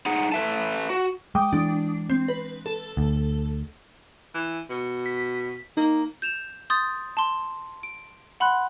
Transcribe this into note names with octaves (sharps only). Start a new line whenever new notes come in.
D#4 G#4 F#5
A4 B4 E5 A5
F#4
G#3 G5 D6 D#6
E3 G#3 D4
C4
B4
A4
D2
E3
B2
B6
A#3 D#4
G6 E7 F7
C6 D#6 G6 A6
A5 C6
D7
F#5 B5 C6 F#6